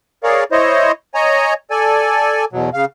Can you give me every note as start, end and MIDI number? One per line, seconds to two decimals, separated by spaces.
0.24 0.44 68
0.24 0.44 70
0.24 0.44 73
0.24 0.44 74
0.24 0.44 77
0.52 0.92 64
0.52 0.92 72
0.52 0.92 73
0.52 0.92 75
1.15 1.54 73
1.15 1.54 75
1.15 1.54 80
1.15 1.54 82
1.71 2.45 69
1.71 2.45 74
1.71 2.45 80
2.52 2.70 40
2.52 2.70 47
2.52 2.70 54
2.74 2.85 49
2.74 2.85 77